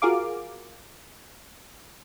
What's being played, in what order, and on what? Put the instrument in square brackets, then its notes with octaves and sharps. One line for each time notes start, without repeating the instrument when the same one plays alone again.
[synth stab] F4 F#4 G#4 A#4 F5 D6